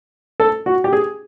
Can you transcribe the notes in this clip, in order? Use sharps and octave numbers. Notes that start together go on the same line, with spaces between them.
A4
F#4
G4
G#4